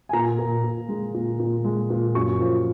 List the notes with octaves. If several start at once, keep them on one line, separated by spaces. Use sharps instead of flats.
G#5
A#2 A#5
A#2
A#2
G#3
A#2
A#2
G#3
A#2
F#2 C#6
F3